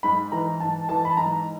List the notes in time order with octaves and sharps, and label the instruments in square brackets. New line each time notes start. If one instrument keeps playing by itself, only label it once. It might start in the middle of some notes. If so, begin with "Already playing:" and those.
[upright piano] G#2 B5
E3 A#5
G#2 A5
E3 A5
B5
G#2 A#5